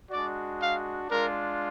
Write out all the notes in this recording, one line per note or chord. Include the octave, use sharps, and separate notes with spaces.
G#3 D4 F#4 D5
F5
G#3 D4 F4 A#4